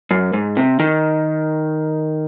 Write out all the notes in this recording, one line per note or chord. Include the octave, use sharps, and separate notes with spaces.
F#2
G#2
C3
D#3